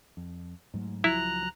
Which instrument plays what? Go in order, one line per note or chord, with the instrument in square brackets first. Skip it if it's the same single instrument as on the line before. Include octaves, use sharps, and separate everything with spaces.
[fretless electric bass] F2
G#2 F#3 A3
[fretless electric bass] C#2 F3 F#3 [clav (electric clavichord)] E4 [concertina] A#5 F#6